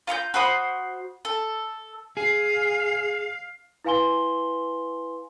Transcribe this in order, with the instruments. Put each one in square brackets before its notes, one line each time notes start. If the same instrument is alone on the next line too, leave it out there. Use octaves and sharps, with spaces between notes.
[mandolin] F4 A#5 C#6 G6
F#4 C5 B5 D#6
A4
[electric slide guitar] G#4 [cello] F5
[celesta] E4 B4 F5 G#5 C6 G7